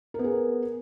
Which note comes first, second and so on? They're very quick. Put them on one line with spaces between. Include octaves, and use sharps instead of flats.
A#4 B3 G#4